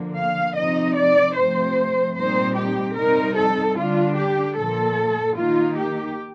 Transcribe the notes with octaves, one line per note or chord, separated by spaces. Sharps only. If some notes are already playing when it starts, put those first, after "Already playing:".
Already playing: D3 F3 A#3
F5
C3 F3 C4 D#4 D#5
D5
C3 F3 A3 C4 C5
A#2 G3 C4 D#4 C5
G4
C3 G3 C4 D#4 A#4
A4
D3 G3 D4 F4
G4
A#2 F3 A#3 A4
D#3 A#3 D#4 F4
G4